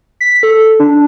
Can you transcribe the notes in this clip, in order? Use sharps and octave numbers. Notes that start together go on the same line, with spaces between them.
B6
A4
D4